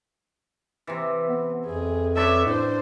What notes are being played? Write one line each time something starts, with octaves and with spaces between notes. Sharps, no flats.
C3 E3
B3
F2 G#4
A4 B4 C#5 D5 E5
A2 D4 C5